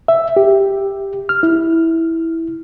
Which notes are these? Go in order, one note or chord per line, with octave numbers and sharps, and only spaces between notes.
E5
G4
F6
E4